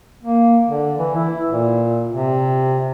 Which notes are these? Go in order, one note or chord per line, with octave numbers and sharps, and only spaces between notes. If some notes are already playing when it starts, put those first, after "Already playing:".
A#3
D3
E3
E4
A#2
C3